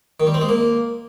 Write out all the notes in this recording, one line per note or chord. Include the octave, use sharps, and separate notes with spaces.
D#3
G3
C4
G#3
A#3